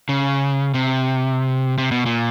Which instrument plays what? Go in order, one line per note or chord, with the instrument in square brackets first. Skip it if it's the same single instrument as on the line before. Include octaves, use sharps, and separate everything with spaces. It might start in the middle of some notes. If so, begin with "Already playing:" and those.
[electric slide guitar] C#3
C3
C3
B2
A#2